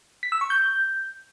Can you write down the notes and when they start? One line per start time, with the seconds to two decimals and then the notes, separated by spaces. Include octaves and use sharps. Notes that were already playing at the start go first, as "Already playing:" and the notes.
0.23 B6
0.32 E6
0.41 C#6
0.50 G6